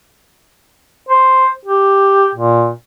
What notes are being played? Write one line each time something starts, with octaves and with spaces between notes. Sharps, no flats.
C5
G4
A#2